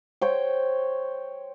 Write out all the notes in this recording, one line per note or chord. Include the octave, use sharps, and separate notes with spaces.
C5 C#5 G5